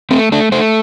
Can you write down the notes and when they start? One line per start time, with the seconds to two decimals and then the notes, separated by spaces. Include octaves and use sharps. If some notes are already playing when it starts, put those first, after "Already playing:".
0.11 A3 C4
0.32 A3 D4
0.52 A3 C5